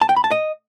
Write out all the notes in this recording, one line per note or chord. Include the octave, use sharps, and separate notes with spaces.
A5
G5
B5
A5
D#5